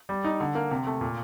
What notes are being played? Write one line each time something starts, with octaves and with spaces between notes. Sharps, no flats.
G3
D#4
D3
A#3
C3
A3
A#2